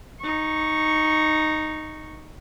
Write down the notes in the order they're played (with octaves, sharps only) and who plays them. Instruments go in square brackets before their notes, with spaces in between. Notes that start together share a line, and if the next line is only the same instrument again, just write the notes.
[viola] D#4 C#6